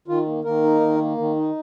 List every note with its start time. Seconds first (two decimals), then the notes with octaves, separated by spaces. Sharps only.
0.08 D#3 F4
0.27 A#3
0.44 D#3 A#3 A#4
0.63 D#4
0.81 D#3
0.99 A#3
1.18 D#3
1.36 D#4